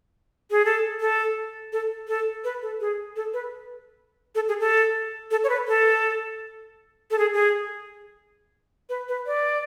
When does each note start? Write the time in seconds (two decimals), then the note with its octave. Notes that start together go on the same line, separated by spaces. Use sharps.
0.51 G#4
0.65 A4
1.01 A4
1.73 A4
2.08 A4
2.44 B4
2.62 A4
2.81 G#4
3.16 A4
3.34 B4
4.35 A4
4.48 G#4
4.60 A4
5.31 A4
5.44 C#5
5.50 B4
5.68 A4
7.11 A4
7.19 G#4
7.33 G#4
8.89 B4
9.08 B4
9.26 D5